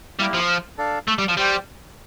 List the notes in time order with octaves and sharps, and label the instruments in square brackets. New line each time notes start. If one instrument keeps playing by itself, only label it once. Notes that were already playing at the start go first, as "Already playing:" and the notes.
[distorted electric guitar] G3 [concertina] A#3 E4 G4 A#4
[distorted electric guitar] F3
[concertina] D4 A4 D5 F5
[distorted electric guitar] A3
G3
F3
[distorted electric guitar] G3 [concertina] G4 C5 G5